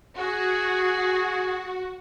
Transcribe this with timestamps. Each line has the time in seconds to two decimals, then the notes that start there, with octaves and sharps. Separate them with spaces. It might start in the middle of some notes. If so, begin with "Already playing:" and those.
0.18 F#4 G#4